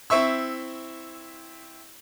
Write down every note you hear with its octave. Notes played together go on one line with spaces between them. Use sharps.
C4 E4 E5 C#6 E6